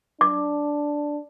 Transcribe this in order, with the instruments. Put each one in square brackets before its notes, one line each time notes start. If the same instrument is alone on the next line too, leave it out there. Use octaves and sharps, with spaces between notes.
[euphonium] D4 [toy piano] D6